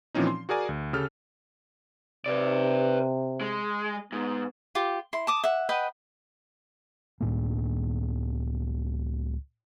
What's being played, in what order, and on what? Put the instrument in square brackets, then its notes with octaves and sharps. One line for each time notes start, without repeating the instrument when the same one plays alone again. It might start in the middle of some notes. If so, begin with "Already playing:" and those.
[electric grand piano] A#2 E3 F3 C4 C#4 D#4
C6
F#4 G#4 A#4 D5 G#5
D2
C#3 G4 A4 F6
[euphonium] C3 [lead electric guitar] B4 D5
[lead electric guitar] G#3
[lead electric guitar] G#2 [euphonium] B3
[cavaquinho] F4 G4
E4 C6
A5 D6 D#6
E5 F#5
B4 D#5 F#5 G5
[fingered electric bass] C#2 A2 A#3